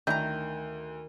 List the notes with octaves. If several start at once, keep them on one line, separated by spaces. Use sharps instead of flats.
D2 D#3 D4 E4 A#5 G6